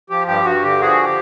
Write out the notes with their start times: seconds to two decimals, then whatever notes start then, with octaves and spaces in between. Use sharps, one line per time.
0.10 F3 G4
0.27 G2 G4
0.45 G2 F#4
0.62 D3 G4
0.80 F3 F#4 G#4
1.04 G4